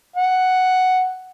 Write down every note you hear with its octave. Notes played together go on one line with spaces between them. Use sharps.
F#5